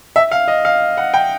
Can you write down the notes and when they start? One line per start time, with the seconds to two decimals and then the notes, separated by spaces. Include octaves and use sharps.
0.16 E5
0.31 F5
0.48 D#5
0.65 F5
0.97 F#5
1.14 G5